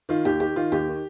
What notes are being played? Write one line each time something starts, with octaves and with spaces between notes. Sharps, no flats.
D#3 F4
D#2 G4
D#3 G4
D#3 F4
D#2 G4
D#3